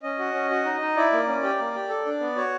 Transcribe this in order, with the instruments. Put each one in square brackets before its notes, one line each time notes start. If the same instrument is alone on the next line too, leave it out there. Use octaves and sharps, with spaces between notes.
[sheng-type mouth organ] C#4 D#5
F#4
C#4
F#4
D#4
D#4
E4 D5
A#3
C#4
G4
A#3
G4
A4
D4
B3
F#4 C#5